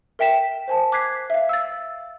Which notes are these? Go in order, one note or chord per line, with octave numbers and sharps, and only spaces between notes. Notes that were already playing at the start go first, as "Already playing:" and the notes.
A#4 E5 G5 B6 E7
C5 G#5 A5
D6 F#6 G#6 B6 C7
E5 F5
E6 A6